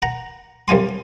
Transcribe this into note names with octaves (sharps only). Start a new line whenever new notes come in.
F#5 A#5
C2 G3 F4 G#5 C6